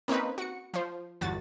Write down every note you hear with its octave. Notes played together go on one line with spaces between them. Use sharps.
A#3 C4 C#4 D#4 B4
F#4 C#7
F3 C5
G1 E2 F#4 A6